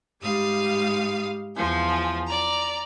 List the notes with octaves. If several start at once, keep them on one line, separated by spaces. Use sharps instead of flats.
G#2 G3 F5 D#6
E2 F3 G#5
D5 A#5